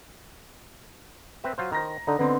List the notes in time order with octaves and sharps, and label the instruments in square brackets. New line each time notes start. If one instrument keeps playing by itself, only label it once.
[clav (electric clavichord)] C4 B4 E5
F#3 F4 C5
[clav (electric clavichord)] D#3 C5 [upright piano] A#5 A#6
[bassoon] D3 [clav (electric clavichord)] D#4 [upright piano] A#5
[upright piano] D3 C4 [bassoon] B3